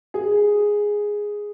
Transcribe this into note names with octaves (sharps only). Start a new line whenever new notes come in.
G#4